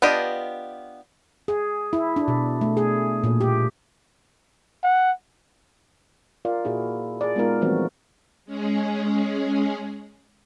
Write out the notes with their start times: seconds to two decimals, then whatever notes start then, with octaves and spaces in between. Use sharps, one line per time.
0.02 B3 D4 F4 G4 D#5
1.48 G#4
1.93 E4
2.16 D4
2.28 B2
2.61 A3
2.77 G#4
3.24 A#2
3.41 G4
4.83 F#5
6.45 F4 A#4 D5 F5
6.65 A#2 E4 F#4 G#4
7.21 G#4 D5
7.36 G#3 B3 D#4 F4 A#4
7.62 E3 F3 G3 A3 C4 F#4
8.45 G#3 C#4 G#4